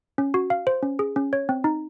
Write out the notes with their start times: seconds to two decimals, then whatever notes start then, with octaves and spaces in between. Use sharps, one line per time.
0.18 C#4
0.34 F#4
0.50 F5
0.67 C5
0.83 C#4
0.99 G#4
1.16 C#4
1.33 C#5
1.49 C4
1.64 D#4